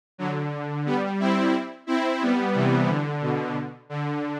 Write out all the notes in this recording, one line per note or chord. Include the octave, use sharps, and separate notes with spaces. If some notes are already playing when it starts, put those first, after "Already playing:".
D3 F#3
G3 B3
C4 E4
C4 E4
G3 B3
C3 E3
D3
B2
D3